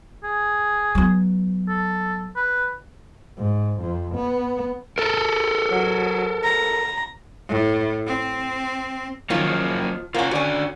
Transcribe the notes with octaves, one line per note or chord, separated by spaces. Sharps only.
G#4
F#3 B3
A4
B4
G#2
F2
B3
A4 A#4
F#3
A#5
A2
C4
D#3 F3 F#3 A#3 C#4
A#3 C#4 F4 C5 F#5
D3 C#4 F#4 D5